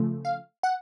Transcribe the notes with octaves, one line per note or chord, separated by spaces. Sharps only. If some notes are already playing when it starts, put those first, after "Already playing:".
Already playing: C#3 F3 A3
F5
F#5